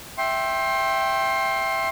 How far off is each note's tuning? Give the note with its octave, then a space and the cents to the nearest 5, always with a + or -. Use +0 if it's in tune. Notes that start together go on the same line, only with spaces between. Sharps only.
E5 +0 G5 +0 C6 +30